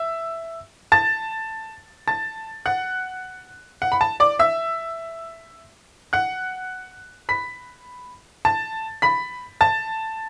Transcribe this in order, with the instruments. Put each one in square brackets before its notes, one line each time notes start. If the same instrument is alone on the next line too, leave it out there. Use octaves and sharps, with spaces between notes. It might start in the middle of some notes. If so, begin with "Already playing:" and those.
Already playing: [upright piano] E5 E6
A5 A6
A5 A6
F#5 F#6
F#5
B5
A5
D5 D6
E5 E6
F#5 F#6
B5 B6
A5 A6
B5 B6
A5 A6